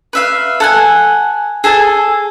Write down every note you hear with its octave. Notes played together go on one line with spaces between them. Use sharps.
B4 E5 F5
A4 F#5 G#5
G#4 A4 G#5 A5